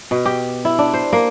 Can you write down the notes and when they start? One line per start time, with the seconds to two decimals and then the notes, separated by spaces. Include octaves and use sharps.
0.11 B2
0.25 G4
0.65 E4
0.78 D4
0.93 C5
1.13 A#3